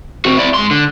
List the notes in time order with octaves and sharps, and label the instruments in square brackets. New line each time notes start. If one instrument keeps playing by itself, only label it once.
[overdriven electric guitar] C4 F#4
E4 D5
G#2 C6
D3